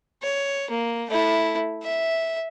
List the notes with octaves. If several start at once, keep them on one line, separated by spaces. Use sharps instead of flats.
C#5
A#3
A3 E4
E5